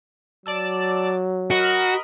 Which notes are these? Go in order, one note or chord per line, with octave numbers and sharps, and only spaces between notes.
F#3 D5 A5 E6
F#4 A#4 D#5 B5